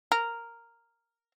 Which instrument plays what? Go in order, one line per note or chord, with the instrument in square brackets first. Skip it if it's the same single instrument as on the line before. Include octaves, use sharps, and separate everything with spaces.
[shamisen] A#4